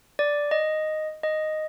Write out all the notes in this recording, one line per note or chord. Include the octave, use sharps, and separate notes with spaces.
D5
D#5
D#5